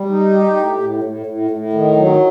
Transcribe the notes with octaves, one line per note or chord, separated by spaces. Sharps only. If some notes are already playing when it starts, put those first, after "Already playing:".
Already playing: G3
D#4
G4
A2
A2
A2
A2
A2
D#3
F#3